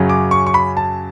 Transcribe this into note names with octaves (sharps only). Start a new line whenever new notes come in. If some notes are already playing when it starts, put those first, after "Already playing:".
Already playing: F#2 C#3 F#3 C#4
D6
C#6
C#6
B5
A5